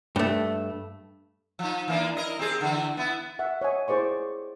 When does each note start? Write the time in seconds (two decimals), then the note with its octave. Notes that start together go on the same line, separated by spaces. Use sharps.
0.16 G2 A3
1.59 F3 D#4
1.88 E3 A#3 D4
2.17 E4 A#4 D#5
2.39 C4 G4 G#4
2.61 D3 E3
2.97 B3 E4
3.39 E5 F#5
3.61 C#5 D#5 G#5
3.88 E4 G#4 C5 D5 C#6